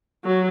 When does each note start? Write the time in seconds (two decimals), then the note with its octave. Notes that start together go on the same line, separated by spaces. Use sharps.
0.24 F#3